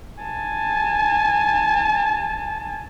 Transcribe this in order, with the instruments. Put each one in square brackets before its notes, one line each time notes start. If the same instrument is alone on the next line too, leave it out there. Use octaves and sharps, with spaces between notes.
[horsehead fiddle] G#5 A5